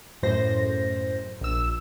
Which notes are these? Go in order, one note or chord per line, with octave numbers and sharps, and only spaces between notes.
F#2 A2 C5 A#6
A#1 E6